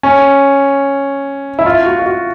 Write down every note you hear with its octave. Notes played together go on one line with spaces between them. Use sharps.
C#4
E4
F4
F#4
F4
F#4